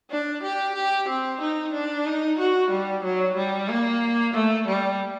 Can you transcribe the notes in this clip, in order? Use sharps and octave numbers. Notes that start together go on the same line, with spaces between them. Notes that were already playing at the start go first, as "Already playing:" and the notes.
D4
G4
G4
C4
D#4
D4
D#4
F#4
G3
F#3
G3
A#3
A3
G3